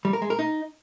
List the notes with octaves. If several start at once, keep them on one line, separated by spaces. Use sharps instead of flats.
G3
A#4
G#3
A#4
D#4